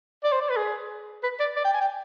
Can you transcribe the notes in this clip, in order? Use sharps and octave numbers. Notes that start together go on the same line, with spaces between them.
D5
C5
D5
B4
G#4
B4
D5
D5
G5
G#5
G5